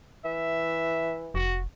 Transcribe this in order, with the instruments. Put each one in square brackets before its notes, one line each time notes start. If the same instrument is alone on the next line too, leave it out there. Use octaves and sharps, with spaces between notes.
[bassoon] E3 [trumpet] E5
[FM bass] F1 [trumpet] F#4